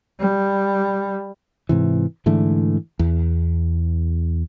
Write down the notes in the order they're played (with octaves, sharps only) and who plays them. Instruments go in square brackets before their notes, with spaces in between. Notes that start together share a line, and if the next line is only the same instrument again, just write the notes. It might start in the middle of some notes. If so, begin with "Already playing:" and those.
[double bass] G3
[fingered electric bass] G#2 C3 E3
G#2 D3 E3 A3
E2